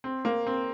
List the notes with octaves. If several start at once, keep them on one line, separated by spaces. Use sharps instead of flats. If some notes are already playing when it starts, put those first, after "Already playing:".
C4
A#3
C4